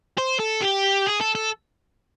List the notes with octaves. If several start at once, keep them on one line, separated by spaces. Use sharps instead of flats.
C5
A4
G4
G#4
A4
A4